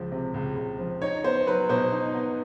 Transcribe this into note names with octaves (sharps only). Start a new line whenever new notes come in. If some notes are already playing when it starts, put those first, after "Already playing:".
Already playing: C#2 F3
C3
C#2
C#2
F3
D#4 C#5
B3 C5
F#3 B4
B2 C5
D#4
B3